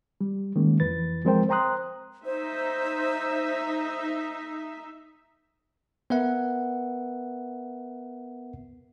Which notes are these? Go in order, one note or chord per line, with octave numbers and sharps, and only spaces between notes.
G3
D#3 G#3 A#3 C#4
F2 E3 B4 A6
F3 G#3 C4 A#4 C5 G5
C5 G5 A#5 C6 D#6 F#6
D#4 C5 E5
B3 A#4 B4 E5 F#5